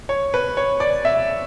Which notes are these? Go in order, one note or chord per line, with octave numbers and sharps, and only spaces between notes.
C#5
B4
C#5
D5
E5